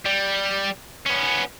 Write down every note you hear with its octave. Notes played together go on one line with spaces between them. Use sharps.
G3
B3 C#4